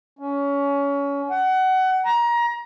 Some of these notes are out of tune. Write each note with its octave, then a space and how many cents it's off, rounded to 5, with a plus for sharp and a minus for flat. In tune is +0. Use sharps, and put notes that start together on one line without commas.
C#4 +25
F#5 +25
A#5 +25